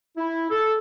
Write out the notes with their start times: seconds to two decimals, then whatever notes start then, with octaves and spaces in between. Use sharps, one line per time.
0.17 E4
0.50 A4